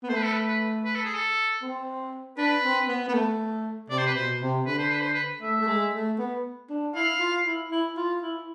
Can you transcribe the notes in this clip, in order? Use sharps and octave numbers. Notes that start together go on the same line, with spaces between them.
B3
A3 C5
B4
A4
B4
B4
B4
A4
G#4
A4
C4
D4 B4
C4
B3
B3
A3
C3 D5
C5
B4
B2 C5
C3
D3 B4
C5
B4
C5
B4
A3 E5
A3
G#3
A3
B3
D4
E4 F5
F4
E4
E4
F4
E4